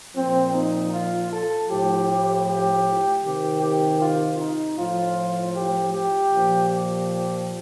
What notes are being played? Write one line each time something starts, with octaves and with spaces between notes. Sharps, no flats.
A#2 F3 C4
D#4
F4
A4
A2 F3 G4
G4
C3 D#3 G4
G4
F4
D#4
A2 F3 F4
G4
G4
A#2 F3
G4